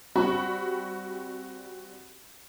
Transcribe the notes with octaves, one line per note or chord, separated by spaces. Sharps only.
G3 C4 F#4 B5 C#6